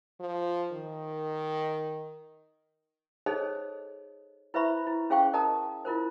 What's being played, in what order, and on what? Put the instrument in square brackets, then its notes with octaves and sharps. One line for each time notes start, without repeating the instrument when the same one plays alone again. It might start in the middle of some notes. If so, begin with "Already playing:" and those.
[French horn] F3
D#3
[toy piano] D#4 G#4 A4 C5 C#5 D#5
E4 B4 C5 E5 B5 C#6
E4
C#4 G#4 C5 F5 G5 C#6
A#4 D#5 A5 A#5 D#6
E4 F4 A#4 C5